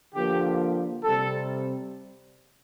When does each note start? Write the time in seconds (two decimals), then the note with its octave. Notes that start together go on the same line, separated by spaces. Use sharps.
0.15 D3 F3 A#3 G4
1.03 C3 G3 C4 A4